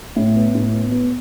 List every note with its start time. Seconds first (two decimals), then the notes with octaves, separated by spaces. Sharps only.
0.16 A2
0.36 B3
0.55 A2
0.73 B3
0.92 B3